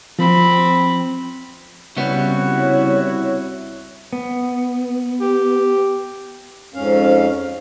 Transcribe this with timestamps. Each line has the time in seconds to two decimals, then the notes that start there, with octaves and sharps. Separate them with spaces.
0.19 F3 C4 B5
1.97 C2 C#3 G3 B3 E4 F#4 C#5
4.13 B3
5.21 G4
6.74 F2 G#2 C#4 F5